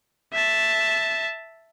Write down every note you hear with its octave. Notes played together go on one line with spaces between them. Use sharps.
E5 A5